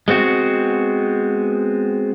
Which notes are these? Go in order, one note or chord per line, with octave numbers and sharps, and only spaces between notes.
G#3 B3 C4 F#4